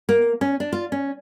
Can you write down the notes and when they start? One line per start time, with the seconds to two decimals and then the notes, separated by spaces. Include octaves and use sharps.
0.09 A#3
0.41 C#4
0.60 D4
0.73 F4
0.92 C#4